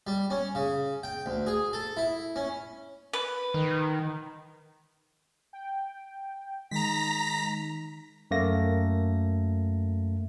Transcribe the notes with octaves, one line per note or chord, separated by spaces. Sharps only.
G3
C#4
C#3
G5
D2
G#4
A4
E4
C#4
B4
D#3
G5
D#3 G#3 A#5 A#6 B6
F#2 A3 A#3 A#6